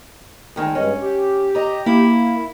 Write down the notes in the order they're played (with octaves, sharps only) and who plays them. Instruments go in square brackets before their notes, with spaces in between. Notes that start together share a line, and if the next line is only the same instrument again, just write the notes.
[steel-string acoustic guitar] D2 D#3 G#3
[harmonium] G2 G#3 [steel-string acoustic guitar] C#4
[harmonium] G4
[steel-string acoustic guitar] D#5 A#5
[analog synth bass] A#3 [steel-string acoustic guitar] E4